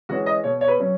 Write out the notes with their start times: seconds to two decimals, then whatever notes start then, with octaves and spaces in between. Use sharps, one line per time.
0.09 E3 G#3 C#4 F#4
0.26 D#5
0.44 B2 C#5
0.61 C#5
0.68 B4
0.80 F#3 C#4